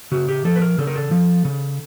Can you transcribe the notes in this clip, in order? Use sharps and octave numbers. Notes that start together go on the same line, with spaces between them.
C#3 F#4
G4
F3 A4
B4
A#4
C#3 A4
A#4
A4
F3
C#3